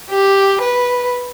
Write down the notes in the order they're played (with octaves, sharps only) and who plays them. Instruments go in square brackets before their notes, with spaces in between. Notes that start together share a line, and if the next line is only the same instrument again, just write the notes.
[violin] G4
B4